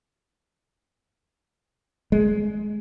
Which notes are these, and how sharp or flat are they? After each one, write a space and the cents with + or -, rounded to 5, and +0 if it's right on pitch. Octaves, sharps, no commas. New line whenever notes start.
G#3 +15